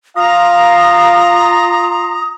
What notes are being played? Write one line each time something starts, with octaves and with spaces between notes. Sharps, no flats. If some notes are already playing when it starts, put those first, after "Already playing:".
F4 F5 A#5 D#6